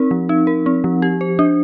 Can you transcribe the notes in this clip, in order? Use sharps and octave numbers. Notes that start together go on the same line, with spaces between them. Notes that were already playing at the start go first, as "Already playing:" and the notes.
Already playing: C4 D#4 A#4
F3
D#4
A#4
C4
F3
G4
C5
D4